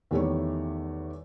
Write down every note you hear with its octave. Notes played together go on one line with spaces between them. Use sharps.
E2 D#3 G3 A3 E4 C#5